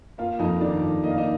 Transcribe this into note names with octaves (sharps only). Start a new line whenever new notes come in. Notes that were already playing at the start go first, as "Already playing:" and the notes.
A#3 F4 F5
F2 D#4 D#5
D#3 D4 D5
F2
A#3 D#5
F5
D#4 D#5